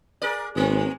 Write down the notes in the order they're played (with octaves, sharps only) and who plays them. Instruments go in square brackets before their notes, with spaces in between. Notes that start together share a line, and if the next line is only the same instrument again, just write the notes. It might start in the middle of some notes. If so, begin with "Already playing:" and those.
[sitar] G#4 A#4 D5
[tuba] G#1 [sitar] G#3 A3 C4